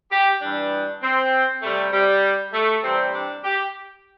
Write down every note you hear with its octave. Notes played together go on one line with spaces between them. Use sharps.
G4
G2 E3 G3 D4
C4
C3 G3 A3
G3
A3
C3 E3 G3 C4
D4
G4